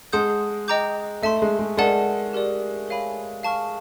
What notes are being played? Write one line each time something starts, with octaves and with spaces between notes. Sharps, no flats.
G#3 F#5 A5 C6 D#6 G6
D#5 G5 A#5 D6 G6
A3 E5 A5 C6
G#3
G#3
G#3 A#4 D5 F#5 A5
G4 A#4 D5
A#4 C#5 F5 G#5 B5
F5 A5 C#6 F6